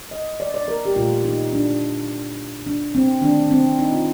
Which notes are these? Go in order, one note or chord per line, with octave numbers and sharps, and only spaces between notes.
D#5
D5
D5
A#4
G4
A#2 A3 F4
D#4
D4
D4
C4
D#3 A3 D4
C4
D#4
F4